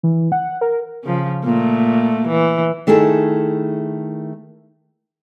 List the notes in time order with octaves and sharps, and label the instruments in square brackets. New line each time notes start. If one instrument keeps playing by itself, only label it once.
[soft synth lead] E3
F#5
A#4
[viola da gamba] C#3 F3
A#2 A3
E3
[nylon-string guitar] D#3 A3 E4 G#4 A4